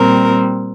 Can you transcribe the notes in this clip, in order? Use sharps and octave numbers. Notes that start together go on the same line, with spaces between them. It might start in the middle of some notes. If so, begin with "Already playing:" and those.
Already playing: A#2 G3 C4 A#4